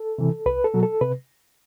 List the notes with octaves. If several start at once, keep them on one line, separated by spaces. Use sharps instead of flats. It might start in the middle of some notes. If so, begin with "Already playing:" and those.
Already playing: A4
C3 E3
C2 B4
A4
B2 F#3
A4
C3 B4